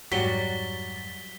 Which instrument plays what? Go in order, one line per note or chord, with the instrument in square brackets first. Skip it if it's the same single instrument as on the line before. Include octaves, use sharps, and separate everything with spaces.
[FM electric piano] F2 G#2 A6 [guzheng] F#3 [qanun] G3 F#4 [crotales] B6 G7